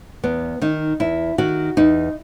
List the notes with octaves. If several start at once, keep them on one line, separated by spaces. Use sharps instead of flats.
E2 B3
D#3 D#4
E2 E4
D#3 F#4
E2 D#4